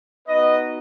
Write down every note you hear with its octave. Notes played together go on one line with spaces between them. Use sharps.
B3 D#4 F#4 B4 D#5